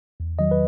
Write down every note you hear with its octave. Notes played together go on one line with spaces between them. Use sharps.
E2
D#3 F#3 D#5
B4